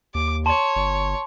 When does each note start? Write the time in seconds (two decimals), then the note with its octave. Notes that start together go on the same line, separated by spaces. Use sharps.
0.15 D#2 D6
0.46 C#5 A5 C6
0.76 G1